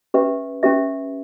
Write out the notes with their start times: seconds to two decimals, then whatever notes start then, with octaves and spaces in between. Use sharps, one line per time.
0.14 C#4 G4 B4 E5
0.63 C#4 G4 B4 E5